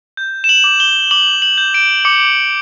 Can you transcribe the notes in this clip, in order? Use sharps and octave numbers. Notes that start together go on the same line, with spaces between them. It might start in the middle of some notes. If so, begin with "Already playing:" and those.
G6
E7
F#7
D6
G7
D6 F#7
F#7
G6
D7
D6 C#7